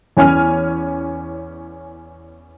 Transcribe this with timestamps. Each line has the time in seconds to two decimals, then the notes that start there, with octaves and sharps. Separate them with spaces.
0.17 E2 C#4 G#5 F6